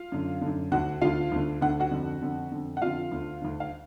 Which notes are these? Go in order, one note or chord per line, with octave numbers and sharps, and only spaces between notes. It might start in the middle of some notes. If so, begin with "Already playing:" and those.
Already playing: F4 F5
F#2 D3
F#2 D3
D2 D3 F#4 F#5
D2 D3 F4 F5
D2 D3
D2 D3 F#5
F#4 F#5
F2 D3
F2 D3
F2 D3
F#5
F2 D3 F4 F5
D2 D3
D2 D3
F5